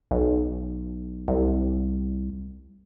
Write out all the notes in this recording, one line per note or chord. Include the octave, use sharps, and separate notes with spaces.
B1
C2